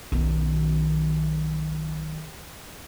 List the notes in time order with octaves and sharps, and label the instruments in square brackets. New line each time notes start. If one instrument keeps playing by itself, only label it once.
[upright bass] B1 D#3